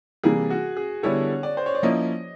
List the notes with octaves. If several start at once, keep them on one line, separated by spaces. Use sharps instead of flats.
C3 E3 G3 A#3 G#4
F#4
G#4
D3 G3 B3 E4 A4 C#5
D5
C5
C#5
D5
F3 A#3 C#4 E4 D#5